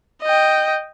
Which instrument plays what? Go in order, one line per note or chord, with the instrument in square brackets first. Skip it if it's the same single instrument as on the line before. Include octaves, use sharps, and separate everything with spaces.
[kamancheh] D#5 G5